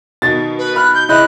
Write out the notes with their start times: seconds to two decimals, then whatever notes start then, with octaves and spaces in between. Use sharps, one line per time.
0.22 B2 D#3 A6
0.58 B4
0.76 B5 F6 F#6
0.94 G6
1.09 C#3 E4 D#5 B5 F#6